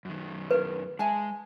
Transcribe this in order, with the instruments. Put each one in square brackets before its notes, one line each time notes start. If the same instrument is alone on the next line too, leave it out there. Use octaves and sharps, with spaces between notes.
[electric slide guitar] F#2 D#3
[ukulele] E4 G#4 A#4 [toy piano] B4
[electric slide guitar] G#3 [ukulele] E5 G#5 A5